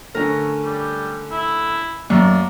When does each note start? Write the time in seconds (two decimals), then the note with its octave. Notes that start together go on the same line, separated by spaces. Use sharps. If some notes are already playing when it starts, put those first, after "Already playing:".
0.15 D3 A3 C#4 A#4
0.65 G3
1.32 E4
2.10 F#2 F#3 A3 A#3 D5